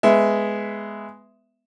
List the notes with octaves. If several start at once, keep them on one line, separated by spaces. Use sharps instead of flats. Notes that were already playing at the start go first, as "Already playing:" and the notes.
G#3 B3 E5